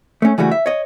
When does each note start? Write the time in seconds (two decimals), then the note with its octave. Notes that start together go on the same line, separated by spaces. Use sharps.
0.22 A3 C#4
0.38 C#3 E3 G3 A3 F#4
0.51 E5
0.66 C#5 D#5